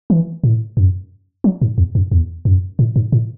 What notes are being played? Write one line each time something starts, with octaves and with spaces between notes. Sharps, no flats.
E3
A2
F#2
F#3
G#2
E2
F#2
E2
F#2
A2
G#2
A2